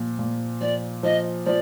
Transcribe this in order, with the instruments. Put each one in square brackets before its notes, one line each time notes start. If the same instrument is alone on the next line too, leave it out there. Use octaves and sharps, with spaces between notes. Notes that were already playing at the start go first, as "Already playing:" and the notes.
Already playing: [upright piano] A#2 F3
A#2
[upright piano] F3 [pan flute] D5
[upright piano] F3 [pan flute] D#5
[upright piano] F3 [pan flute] D5